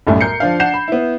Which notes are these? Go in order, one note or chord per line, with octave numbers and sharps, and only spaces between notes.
B1 F#2 A2 G3 A3
A#4 G6 C7 C#7
F3 D4 F5
D4 F#5 G6 C7 E7
B5
B3 E4